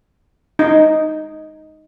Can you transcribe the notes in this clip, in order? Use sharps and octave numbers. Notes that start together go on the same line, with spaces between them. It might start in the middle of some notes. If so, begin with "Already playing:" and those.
D#4